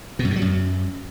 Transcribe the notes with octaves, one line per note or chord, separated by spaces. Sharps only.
B2
F#2
A2
F#3
F#2